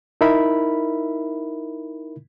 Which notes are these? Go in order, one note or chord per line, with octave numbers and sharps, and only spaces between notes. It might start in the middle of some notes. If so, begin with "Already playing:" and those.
D#4 E4 A#4 E5 B5